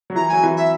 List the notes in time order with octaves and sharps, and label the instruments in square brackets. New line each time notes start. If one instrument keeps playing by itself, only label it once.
[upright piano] F#3
[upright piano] E3 [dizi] A#5
[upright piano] F#3 [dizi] G#5
[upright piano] E3
[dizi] E5